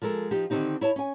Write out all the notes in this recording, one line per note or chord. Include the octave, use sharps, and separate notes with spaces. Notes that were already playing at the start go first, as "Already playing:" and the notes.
F3 G#3 A4 A#4
F3 D#4 G4
D3 D#3 C4 D#4 G4
E4 C#5 E5 A5
C#4 G#5